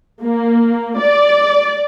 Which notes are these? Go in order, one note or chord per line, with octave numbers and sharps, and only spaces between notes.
A#3
D5